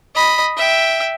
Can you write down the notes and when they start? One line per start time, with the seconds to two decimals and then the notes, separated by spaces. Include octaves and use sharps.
0.15 D#5 B5
0.57 E5 G5